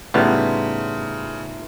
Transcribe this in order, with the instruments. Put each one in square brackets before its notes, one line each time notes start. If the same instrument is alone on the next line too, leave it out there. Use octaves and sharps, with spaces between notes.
[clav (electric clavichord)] A2 G3 B3 [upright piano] C#3 [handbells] D#4 F4 E5